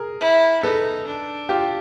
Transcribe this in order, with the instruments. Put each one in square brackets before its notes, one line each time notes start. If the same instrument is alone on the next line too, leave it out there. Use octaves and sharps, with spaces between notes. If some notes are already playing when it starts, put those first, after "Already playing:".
Already playing: [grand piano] G#4 A#4
[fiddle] E4
[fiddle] D#4 [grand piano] A4 B4
[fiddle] D4
[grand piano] F4 G4